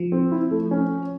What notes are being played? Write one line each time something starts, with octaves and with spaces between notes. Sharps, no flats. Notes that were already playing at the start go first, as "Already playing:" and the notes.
Already playing: F3
C4
E4
A3
C#4